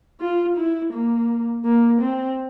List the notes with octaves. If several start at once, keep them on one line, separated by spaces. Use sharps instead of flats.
F4
E4
A#3
A#3
C4